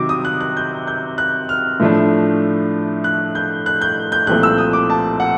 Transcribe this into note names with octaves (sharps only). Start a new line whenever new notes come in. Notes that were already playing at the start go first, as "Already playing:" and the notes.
Already playing: C3 D#3 F#3 D6
D#6
F#6
F#6
G6
G6
F#6
F6
A2 F3 A3 D4
F#6
G6
F#6
G6
G6
C2 A#2 F3 A3 C4 F#6
E6
D#6
D6
A5
F#5